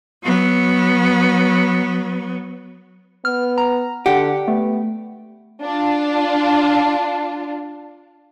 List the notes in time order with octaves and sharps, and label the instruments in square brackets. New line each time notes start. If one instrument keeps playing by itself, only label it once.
[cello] F#3 B3
[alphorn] B3 [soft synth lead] F6
[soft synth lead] A#5
[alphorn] D3 [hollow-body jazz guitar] G4 [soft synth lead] F#5
[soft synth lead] A3 [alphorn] B3
[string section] D4 F4